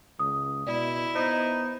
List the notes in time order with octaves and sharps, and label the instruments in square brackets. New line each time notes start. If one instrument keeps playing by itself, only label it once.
[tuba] C#2 [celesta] D#6
[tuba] B2 [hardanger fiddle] E4 [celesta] D5
[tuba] B3 [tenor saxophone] D#4 [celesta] C5